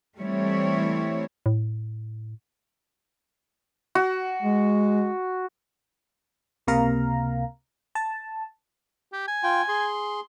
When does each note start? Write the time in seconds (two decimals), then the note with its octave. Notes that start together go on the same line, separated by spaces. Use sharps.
0.18 E3 G3 A3 C4 E4 C#5
1.46 A2
3.95 F#4
4.42 G#3
6.67 C#2 C3 A#3 F5 A#5
7.95 A5
9.12 G4
9.28 G#5
9.43 F4 G5
9.68 G#4 C6